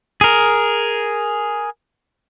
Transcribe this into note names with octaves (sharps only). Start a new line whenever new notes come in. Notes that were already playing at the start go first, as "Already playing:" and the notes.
G#4 A#4